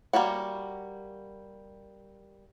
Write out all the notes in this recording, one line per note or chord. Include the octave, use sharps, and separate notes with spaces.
G3 A#3 F#4 F#5